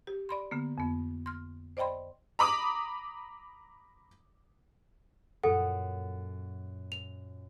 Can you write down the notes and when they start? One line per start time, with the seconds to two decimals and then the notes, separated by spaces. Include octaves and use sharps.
0.07 G4
0.29 D5 B5 C6
0.51 D3 A#3 B3
0.78 F2 B3
1.26 C6 F6
1.77 C5 D5 D#5 G5 B5 C6
2.39 A#5 B5 D6 D#6
5.43 F#2 A#2 F#3 A4 F#5
6.92 F7